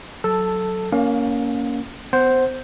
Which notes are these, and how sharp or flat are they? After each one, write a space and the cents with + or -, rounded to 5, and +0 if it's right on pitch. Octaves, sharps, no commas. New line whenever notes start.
F#3 +0 A4 +0 A5 +10
A#3 +5 C#4 +15 F5 +35
B3 +35 C5 +0 F#5 +20